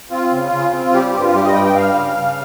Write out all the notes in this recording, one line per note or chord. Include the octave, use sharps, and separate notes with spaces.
C4 F4
C#3
C#3
C4
G3 G4
G4
G2
F4
G3 G4
D#5
G2 G5
G5
G3 F5
C#3
C#3